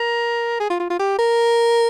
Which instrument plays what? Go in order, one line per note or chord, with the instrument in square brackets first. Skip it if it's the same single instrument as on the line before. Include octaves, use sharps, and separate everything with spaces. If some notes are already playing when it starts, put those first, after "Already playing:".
Already playing: [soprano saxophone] A#4
G#4
F4
F4
F4
G4
A#4